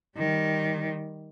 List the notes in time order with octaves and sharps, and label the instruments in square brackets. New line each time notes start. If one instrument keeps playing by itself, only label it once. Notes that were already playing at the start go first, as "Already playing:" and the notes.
[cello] D#3 G3